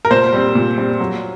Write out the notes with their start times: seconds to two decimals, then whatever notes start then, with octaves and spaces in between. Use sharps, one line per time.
0.05 A#4
0.11 A#2 C5
0.33 G3 C4
0.55 A#2
0.78 G3 C4
1.00 F#3